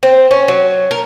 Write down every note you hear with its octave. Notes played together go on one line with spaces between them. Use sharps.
C4
C#4
F#3
A#4